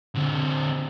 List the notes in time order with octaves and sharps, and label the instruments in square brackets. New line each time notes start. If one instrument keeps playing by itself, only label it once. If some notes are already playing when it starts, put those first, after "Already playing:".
[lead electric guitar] D3 C4